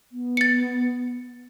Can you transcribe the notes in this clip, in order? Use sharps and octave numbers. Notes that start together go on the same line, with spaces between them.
B3
A6 C#7